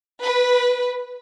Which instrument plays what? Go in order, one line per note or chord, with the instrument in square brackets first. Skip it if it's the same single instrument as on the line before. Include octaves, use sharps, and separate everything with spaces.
[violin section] B4